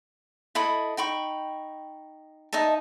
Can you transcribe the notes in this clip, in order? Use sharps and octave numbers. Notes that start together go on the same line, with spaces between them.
E4 A4 D#5 B5
D#4 G5 B5 C#6
D#4 D#5 E5 A5